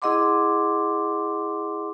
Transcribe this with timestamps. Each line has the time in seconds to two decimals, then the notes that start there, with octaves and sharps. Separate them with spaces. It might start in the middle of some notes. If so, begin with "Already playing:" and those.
0.02 E4 G#4 D#5 F#5 C6 D6